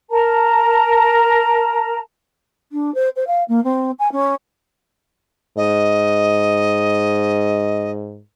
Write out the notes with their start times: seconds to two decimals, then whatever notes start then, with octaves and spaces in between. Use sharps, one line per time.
0.10 A#4 A5 A#5
2.72 D4
2.94 C5
3.16 C5
3.27 F5
3.48 A#3
3.64 C4
3.99 G#5
4.12 C#4
5.57 G#2 D#5